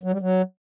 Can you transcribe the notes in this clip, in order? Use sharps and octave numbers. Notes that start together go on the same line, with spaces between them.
F#3
G3
F#3